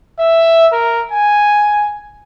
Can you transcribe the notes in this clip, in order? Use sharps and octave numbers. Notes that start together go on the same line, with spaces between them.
E5
A#4
G#5